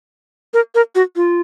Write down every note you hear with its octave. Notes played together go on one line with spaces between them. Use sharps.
A#4
A#4
F#4
F4